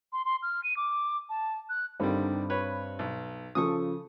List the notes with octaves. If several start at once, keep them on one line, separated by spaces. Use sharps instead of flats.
C6
C6
F6
D#7
D6
A5
F#6
G2 D3 D#3 G3 C4
B4 C#5
B1
C#3 F3 A4 C#6 D#6